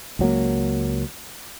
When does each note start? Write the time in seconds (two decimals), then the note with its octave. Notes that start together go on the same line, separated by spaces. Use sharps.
0.19 C#2 F#3 A#3